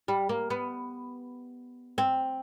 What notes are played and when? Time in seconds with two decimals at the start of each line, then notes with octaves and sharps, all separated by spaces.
0.08 G3
0.29 A#3
0.50 B3
1.98 C4